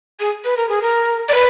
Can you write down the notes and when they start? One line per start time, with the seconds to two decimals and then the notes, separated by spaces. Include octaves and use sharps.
0.20 G#4
0.44 B4
0.57 A#4
0.69 G#4
0.82 A#4
1.29 D5
1.34 B4